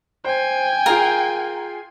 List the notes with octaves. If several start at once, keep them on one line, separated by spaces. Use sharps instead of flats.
C5 G5 G#5
F4 G#4 A#4 F5